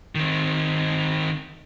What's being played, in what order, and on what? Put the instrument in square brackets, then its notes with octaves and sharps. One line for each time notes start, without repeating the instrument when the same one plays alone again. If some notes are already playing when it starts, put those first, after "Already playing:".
[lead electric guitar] D#3 C4